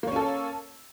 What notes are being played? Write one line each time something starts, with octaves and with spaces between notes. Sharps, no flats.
A#3 C#4 A4 C#5